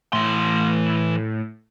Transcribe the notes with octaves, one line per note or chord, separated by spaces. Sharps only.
A2 E3 C6